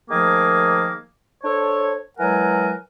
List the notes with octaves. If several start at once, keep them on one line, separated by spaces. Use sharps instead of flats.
D#3 F3 A3 A#3 G#4 D6
D4 A4 C5 C#5
E3 F#3 G#3 A#4 F#5 G#5